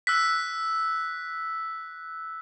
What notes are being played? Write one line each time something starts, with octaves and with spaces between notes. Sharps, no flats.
E6 F#6 B6